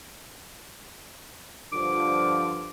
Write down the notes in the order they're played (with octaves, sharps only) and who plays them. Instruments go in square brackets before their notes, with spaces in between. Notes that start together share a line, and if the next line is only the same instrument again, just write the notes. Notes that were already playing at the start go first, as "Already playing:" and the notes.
[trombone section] G2 D3 F3 [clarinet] D6